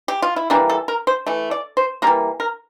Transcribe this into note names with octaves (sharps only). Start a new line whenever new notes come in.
G4
F4
E4
E3 G3 A#3 D4
A4
A#4
C5
E3 A3
D5
C5
E3 G3 A#3 A#4
A#4